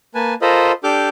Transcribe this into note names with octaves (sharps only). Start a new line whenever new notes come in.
A#3 B4 G#5 A5
F4 A4 A#4 C5 D#5 B5
D4 G4 A4 D6 F6 G6